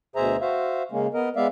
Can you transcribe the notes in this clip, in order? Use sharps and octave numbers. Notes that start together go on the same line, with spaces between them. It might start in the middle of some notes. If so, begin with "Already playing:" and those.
D2 B2 G#4 C5 E5 A#5
F#4 C5 E5 F5
C#3 G#3 A#3 C#4
B3 A#4 D#5
G#3 B3 D5 E5 F5